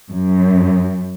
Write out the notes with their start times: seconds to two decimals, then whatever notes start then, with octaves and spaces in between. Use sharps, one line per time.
0.12 F#2